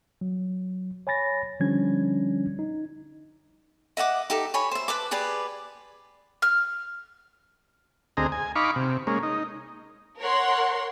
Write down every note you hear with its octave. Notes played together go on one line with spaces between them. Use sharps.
F#3
C#5 G#5 B5 A6 A#6
D3 F3 G3 C#4 D4 G#6
D#4
D#5 E5 F#5 D6
D#4 G4 A4
C#5 G#5 B5
C5 E5
B4 A5 D6
G4 G#4 B4 D5
F6
D2 C4 G#4 D#5 A#5
G#5
D#4 F5 B5 C#6 D6
C3
G#3 A#3 C#4
D#4
A#4 C#5 F#5 C6